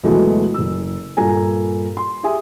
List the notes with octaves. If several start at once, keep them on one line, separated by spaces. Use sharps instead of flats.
D2 B2 E3 F#3 G#3 A3
F#1 E6
G2 A#2 A4 G#5 A#5
C6
G4 G#4 E5 G#5 D#6